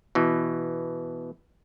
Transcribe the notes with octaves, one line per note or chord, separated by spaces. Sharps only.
B2 E3